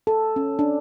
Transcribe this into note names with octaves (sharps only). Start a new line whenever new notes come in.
A4
C#4
D4